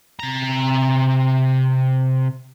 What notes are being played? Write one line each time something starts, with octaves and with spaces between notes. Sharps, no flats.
C3 A#5